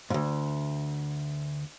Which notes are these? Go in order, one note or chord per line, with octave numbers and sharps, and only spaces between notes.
D2 G#2